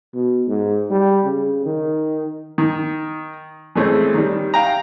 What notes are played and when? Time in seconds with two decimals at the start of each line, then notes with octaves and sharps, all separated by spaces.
0.14 B2
0.48 G#2
0.91 G3
1.24 C#3
1.66 D#3
2.58 D#3
3.76 E3 G#3 A3 C4 C#4
4.14 D#3 G3
4.54 F5 G5 A#5